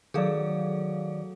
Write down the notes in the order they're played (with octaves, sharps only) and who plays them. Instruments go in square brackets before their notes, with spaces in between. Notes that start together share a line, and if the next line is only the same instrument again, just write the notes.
[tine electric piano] D#3 D5 [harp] F#3 A3 F#4 [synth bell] G#4 A4 F5